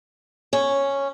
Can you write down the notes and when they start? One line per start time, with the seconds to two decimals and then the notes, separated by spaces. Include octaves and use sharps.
0.53 C#4